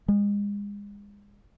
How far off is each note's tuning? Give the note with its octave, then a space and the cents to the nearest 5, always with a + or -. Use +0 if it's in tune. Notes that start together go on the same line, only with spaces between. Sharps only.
G#3 -35